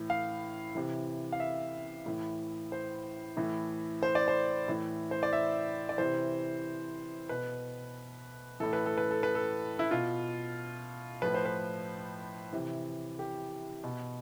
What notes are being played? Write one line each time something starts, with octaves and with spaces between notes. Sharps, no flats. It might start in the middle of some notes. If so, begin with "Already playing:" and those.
Already playing: A2 E3
F5
C3 E3
F5
E5
A2 E3
C5
A2 E3
C5
D5
C5
A2 E3
C5
D5
E5
D5
C3 E3 C5
B2 B4
A2 E3 A4
B4
A4
B4
A4
B4
A4
E4
B2 F4
A2 F3 B4
C5
B4
C3 E3
G4
B2